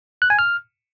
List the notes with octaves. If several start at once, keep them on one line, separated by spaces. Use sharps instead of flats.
F#6
G#5
F6